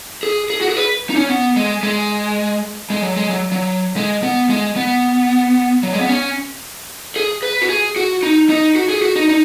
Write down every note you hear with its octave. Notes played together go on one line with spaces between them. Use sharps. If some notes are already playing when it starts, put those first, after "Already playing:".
G#4
G#4
F#4
G#4
B4
D#4
C#4
B3
G#3
G#3
G#3
F#3
G#3
F#3
F#3
G#3
B3
G#3
B3
F#3
G#3
B3
C#4
G#4
B4
F#4
G#4
F#4
D#4
D#4
F#4
G#4
F#4
D#4
D#4